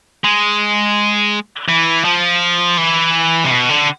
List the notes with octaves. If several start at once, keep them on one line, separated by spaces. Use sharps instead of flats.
G#3
E3
F3
E3
C3
B2
D3